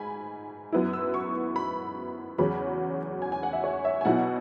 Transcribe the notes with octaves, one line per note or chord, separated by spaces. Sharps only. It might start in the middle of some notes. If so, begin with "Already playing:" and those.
Already playing: G#2 G#5 B5
F#2 F#3 B3 E4
E6
C#6
B5
E2 C#3 F#3 C#4 B5
G#5
G#5
F#5
E5
C#5
E5
G#5
B2 F#3 E4 F#5